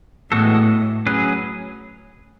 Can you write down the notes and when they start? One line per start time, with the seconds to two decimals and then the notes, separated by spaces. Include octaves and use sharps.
0.31 A2 E3 G#3 B3 F#4 A4
1.06 F#3 C#4 G#4 B4